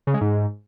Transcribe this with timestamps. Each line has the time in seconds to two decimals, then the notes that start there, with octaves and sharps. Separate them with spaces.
0.07 C#3
0.14 G#3
0.21 G#2